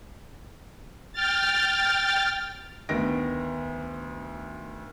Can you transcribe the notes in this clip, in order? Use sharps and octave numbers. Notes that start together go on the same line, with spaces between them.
G5 F6 A6
D2 D#3 B3 A#6 D7